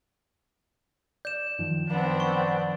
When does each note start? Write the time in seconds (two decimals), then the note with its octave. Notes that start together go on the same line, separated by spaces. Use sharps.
1.25 D5 G6 E7
1.59 F#2 D#3 F3
1.89 B3 C4 D4
2.20 C#6